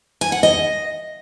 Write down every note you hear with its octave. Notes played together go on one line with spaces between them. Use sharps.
G#5
F#5
D#5